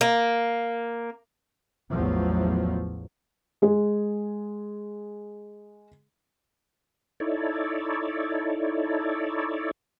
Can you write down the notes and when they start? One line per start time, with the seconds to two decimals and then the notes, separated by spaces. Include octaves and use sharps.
0.01 A#3
1.90 A1 E2 A2 F3 F#3
3.62 G#3 G#4
7.20 D#4 E4 A4 C#5 D5